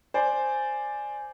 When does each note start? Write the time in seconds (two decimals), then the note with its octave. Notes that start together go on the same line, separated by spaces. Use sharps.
0.14 C5 D5 G#5